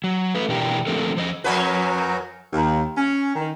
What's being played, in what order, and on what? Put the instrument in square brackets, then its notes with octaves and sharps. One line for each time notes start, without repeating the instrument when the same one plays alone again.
[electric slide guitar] F#3
A3 B4
B2 E3 D4 G4 A#4
D3 F3 A3 C4 A4 A#4
F3 C5 D#5
[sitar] F2 C#4 B4 [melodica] F#3 F#4 A#4
[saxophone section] D#2
C#4
D#3